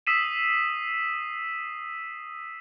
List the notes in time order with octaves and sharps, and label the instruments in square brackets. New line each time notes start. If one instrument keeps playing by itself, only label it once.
[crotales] D#6 E6 B6 C7 D#7 E7